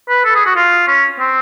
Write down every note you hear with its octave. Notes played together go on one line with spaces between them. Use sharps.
B4
A4
G#4
F#4
F4
C#4
C4